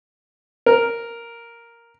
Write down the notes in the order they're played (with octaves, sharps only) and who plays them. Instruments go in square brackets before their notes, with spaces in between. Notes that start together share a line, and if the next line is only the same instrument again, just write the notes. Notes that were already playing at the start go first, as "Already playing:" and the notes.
[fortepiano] A#4